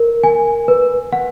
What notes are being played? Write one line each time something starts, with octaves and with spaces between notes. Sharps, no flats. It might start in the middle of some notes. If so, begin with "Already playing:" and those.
Already playing: A#4
G#5
B4
F#5